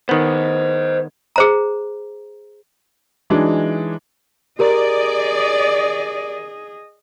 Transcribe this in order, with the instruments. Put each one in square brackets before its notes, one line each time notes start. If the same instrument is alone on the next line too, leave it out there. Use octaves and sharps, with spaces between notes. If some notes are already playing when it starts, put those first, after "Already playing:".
[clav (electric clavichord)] D#3 B3 [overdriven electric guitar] C5 D#5
[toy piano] G#4 C5 A#5
[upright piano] E3 F#3 G#3 D4 D#4
[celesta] G4 A#4 A#5 [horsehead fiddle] G#4 D#5 [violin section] D5